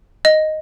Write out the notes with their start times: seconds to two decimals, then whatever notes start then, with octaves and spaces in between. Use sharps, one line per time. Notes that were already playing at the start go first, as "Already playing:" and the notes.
0.25 D#5